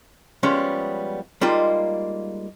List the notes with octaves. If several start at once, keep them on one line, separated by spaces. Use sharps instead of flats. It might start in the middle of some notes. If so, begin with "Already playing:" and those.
F3 G3 G#3 B3 C#4
G3 G#3 A#3 D#4 F4